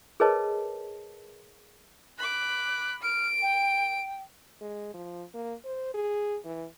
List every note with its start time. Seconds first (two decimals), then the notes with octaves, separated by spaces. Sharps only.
0.20 G#4 A#4 B4 C#5 D#5 A5
2.18 B5 D6 F#6
3.02 F6 D7
3.42 G5
4.61 G#3
4.94 F3
5.34 A#3
5.65 C5
5.94 G#4
6.45 E3